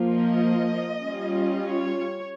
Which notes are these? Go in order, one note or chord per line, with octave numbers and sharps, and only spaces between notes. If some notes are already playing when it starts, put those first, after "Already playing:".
Already playing: F3 A#3 F4
D#5
G3 C#4 F4
C#5